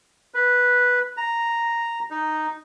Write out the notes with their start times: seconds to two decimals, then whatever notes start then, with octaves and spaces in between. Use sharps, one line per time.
0.34 B4
1.17 A#5
2.11 D#4